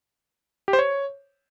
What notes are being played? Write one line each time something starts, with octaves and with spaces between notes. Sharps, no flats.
G4
C5
C#5